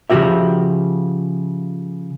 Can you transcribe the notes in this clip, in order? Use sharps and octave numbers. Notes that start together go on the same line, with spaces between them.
C#3 F3 F#3 F#4 G4 E5